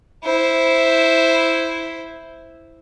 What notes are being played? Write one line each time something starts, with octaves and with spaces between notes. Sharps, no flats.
E4 C5